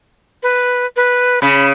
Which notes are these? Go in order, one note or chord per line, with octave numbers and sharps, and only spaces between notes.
B4
B4
C#3 B5